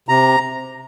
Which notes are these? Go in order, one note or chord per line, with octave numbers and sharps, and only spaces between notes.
C3 A#5